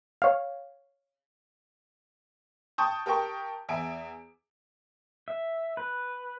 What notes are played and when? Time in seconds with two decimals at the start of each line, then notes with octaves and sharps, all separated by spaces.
0.22 C#5 F5
2.78 G5 A5 C#6 D#6 G6
3.06 G4 A#4 G5 A5 C#6
3.69 E2 E5 G#5 D7
5.28 E5
5.77 B4